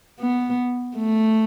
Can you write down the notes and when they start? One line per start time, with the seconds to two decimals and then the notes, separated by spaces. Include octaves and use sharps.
0.20 B3
0.97 A3